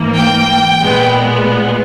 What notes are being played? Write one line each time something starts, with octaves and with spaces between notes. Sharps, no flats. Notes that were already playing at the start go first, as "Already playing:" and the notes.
Already playing: G#2 E3 A#3
G5
A#2 G#3 B3